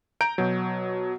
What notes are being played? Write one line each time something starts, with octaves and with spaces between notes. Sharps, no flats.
A#5 G6 D7
B2 F#3